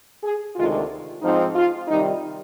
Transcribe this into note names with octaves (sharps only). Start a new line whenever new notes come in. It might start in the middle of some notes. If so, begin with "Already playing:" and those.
G#4
D2 C3 D#3 G#3 F4
G#2 F3 C4 D#4
F4
C3 D#3 G3 D#4